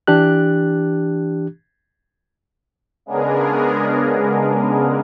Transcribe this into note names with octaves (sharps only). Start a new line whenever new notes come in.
E3 D4 G4 F#6
C#3 G#3 B3 D4 G#4 A#4